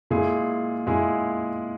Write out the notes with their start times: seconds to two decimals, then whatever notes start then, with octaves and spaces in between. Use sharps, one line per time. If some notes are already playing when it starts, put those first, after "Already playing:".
0.11 A#2 G#3 E4 G#4
0.87 A#2 G#3 E4 G#4